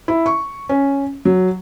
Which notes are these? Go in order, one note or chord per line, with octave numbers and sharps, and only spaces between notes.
E4
C#6
C#4
F#3